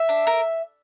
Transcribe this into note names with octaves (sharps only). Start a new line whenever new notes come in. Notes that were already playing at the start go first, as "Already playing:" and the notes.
Already playing: E5
D4
A#4